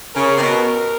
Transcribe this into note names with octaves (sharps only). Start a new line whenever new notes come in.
C#3 A#4
C3
B2